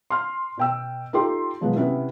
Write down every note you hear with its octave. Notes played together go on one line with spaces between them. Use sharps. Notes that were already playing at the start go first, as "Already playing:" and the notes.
C6 F6
B2 G5 E6
D#4 F4 G4 A4 C6
B2 F3 F#3 G#3 B3
C3 B3 C#4 E4